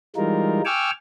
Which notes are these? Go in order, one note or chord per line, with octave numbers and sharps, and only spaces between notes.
E3 G3 G#3 D#4 F4 A#4
G5 G#5 C#6 D6 E6 F6